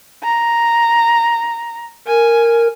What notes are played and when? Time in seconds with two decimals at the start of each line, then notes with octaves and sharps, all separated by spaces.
0.24 A#5
2.07 A#4 G#5